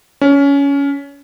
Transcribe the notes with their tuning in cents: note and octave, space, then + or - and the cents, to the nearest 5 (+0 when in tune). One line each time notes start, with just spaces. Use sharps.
C#4 +20